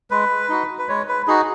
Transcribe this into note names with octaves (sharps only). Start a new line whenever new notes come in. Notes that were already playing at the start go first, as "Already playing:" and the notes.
G#3 B4
D#4 F#4
B4
G#3 C#5
B4
D#4 F#4 G#4